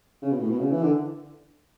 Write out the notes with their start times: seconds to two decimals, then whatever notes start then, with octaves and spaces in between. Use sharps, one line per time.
0.22 C#3
0.31 B2
0.40 A2
0.50 B2
0.59 C#3
0.71 E3
0.83 D3